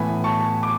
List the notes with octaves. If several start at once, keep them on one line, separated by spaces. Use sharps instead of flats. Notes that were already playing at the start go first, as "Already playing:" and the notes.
Already playing: A2 E3 B3 G#5 B5
A5 C#6
D6